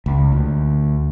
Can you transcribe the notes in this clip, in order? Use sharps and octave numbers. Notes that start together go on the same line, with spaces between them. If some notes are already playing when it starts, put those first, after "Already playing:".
C#2
D2